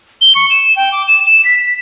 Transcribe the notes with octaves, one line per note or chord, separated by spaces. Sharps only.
G7
C#6
E7
G5
D6
E7
E7
B6
B6